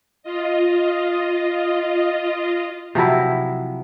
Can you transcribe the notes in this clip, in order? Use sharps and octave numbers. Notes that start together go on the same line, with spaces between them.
F4 D#5
C3 F3 F#3 E4